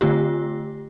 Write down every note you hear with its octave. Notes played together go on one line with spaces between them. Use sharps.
D3 A3 F4 G4